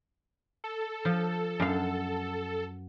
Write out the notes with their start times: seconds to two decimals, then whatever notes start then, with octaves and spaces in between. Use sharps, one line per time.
0.64 A4
1.05 F3
1.60 F#2 F5